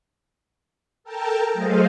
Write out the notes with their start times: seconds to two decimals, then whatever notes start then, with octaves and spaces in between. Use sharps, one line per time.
1.04 A4 A#4 G5 A5 A#5
1.53 F#3 A3 G#4 C5 D#5 F5